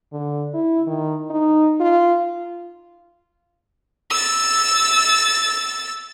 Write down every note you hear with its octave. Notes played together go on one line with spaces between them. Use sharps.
D3
E4
D#3
D#4
F4
E6 A6